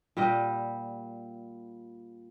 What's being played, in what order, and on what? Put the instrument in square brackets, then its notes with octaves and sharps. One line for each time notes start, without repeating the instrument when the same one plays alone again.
[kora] A#2 G3 G4 D#5